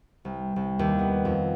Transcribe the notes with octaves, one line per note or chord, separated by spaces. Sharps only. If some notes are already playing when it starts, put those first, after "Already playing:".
C2
C2
D#2
B3
F2